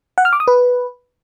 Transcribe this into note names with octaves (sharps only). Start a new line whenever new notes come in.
F#5
F6
D6
D#6
B4